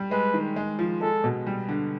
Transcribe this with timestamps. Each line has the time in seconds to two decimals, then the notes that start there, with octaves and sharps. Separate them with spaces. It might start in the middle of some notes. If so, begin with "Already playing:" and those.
Already playing: G3
0.11 G#3 B4
0.34 D#3
0.56 G#3
0.79 F3
1.01 G#3 A4
1.24 B2
1.46 G3
1.69 D3